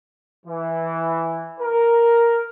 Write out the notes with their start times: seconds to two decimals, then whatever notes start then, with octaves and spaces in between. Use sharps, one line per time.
0.46 E3
1.61 A#4